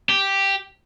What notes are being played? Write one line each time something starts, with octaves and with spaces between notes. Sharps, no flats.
G4